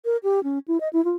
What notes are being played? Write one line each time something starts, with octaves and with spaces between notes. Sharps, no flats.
A#4
G4
C#4
E4
D#5
E4
F4